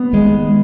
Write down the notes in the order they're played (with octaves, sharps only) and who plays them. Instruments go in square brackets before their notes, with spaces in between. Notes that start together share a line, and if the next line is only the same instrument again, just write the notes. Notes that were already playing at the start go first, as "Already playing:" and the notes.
Already playing: [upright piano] B3
[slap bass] D#3 G#3